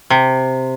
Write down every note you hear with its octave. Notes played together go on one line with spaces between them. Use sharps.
C3